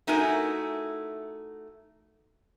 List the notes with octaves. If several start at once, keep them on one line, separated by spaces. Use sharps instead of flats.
A3 D#4 E4 F#4 A#4 G#5